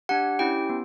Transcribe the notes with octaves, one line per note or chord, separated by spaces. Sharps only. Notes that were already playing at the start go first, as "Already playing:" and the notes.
D4 G4 F#5
C#4 E4 G4 G5
B3